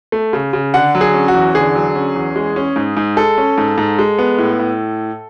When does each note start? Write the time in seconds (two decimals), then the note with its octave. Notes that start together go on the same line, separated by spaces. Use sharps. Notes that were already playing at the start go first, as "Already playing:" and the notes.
0.12 A3
0.33 C#3
0.53 C#3
0.74 D3 F#5
0.95 F#3
1.01 G#4
1.14 C#4
1.28 F#4
1.34 E2
1.55 D3 G#4
1.75 F#3
1.95 C#4
2.15 E2
2.36 G#3
2.56 C#4
2.76 G#2
2.97 G#2
3.17 G#3 A4
3.38 C#4
3.58 G#2
3.78 G#2
3.99 G#3
4.18 B3
4.38 A2
4.59 A2